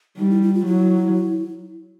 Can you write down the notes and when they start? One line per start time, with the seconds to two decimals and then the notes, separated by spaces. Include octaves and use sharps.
0.18 G3 D#4
0.30 E4
0.42 E4
0.54 F4
0.66 F#3 E4